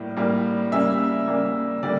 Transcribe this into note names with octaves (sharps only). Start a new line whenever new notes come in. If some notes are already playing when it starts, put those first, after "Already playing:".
Already playing: A2 G3 A#3
A2 G3 A#3
C#3 G3 A#3 E5
C#3 G3 A#3
D3 G3 A#3 D5